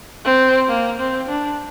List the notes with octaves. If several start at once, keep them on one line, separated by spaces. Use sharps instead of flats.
C4
A#3
C4
D4